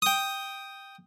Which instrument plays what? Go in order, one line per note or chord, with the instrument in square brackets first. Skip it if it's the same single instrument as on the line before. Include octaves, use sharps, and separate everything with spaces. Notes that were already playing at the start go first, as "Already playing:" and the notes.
[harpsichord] G5 D#6